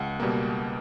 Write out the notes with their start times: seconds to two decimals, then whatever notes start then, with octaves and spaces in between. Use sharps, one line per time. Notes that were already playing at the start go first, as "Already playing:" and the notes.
Already playing: C#2 F#5
0.20 B2 G3 A#3